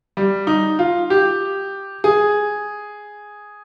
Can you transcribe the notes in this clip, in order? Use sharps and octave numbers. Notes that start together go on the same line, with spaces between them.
G3
D#4
F4
G4
G#4